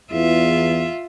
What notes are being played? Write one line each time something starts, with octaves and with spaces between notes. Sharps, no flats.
E2 F4 E5